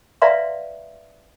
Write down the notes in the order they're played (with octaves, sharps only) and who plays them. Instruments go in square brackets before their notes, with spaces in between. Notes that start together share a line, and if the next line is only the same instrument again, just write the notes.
[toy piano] B4 D5 E5 F5 A#5 C6